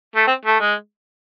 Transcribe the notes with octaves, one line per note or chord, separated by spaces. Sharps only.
A3
C4
A3
G#3